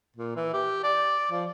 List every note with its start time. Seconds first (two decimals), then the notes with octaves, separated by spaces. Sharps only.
0.16 A#2
0.36 E3
0.53 G4
0.83 D5
1.31 F3